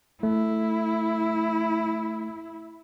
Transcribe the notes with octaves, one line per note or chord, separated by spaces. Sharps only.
A3 E4